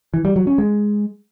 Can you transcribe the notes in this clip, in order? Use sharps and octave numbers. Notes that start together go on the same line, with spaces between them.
E3
G3
F#3
C#4
G#3